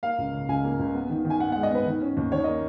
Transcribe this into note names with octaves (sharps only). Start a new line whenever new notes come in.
A#3 F5
C#2
C#3
C#2 G#5
A#3
C#2
B3
D#3
D#3
G#5
B3 F#5
G#3 F#5
D#5
B3 B4
D#3
C#4
D#2
D#3 C#5
A#3 D#5